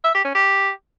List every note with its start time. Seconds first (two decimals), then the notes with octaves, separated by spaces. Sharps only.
0.04 E5
0.14 G4
0.25 C#4
0.35 G4